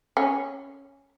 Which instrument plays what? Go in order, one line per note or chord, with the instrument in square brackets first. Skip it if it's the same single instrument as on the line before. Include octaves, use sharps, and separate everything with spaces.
[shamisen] C#4